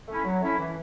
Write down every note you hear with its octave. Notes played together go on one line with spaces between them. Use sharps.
A3 C#4 E4
F#3
A3 C#4 E4
E3